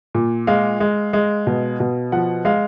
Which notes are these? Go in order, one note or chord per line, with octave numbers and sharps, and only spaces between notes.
A#2
G#3 F5
G#3
G#3
B2
B2
F3 F#5
G#3 F5